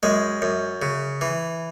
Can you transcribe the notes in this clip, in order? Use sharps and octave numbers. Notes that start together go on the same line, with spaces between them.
F#2 G#3
F#2
C#3
E3